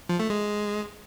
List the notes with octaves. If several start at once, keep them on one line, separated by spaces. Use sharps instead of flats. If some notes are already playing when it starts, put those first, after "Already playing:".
F3
A3
G#3